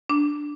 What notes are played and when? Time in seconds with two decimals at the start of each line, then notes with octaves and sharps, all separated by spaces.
0.09 D4